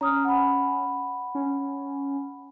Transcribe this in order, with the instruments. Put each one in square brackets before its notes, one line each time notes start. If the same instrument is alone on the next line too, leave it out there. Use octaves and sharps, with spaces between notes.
[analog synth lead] C#4 [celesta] A#5 D#6 F6
[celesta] F#5 B5
[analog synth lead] C#4